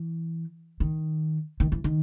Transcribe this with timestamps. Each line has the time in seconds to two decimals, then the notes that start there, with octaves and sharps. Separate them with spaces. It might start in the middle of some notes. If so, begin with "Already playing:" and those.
Already playing: E3
0.80 D#3
1.60 D#3
1.72 E3
1.84 D#3